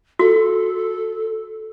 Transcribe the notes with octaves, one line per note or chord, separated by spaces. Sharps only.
F#4 A4